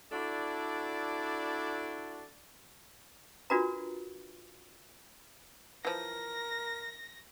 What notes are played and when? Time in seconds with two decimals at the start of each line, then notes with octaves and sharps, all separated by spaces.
0.12 D4 E4 F#4 A4 D5
3.50 D4 F4 F#4 A#4 B4 A#5
5.85 E3 F3 A#4 A#6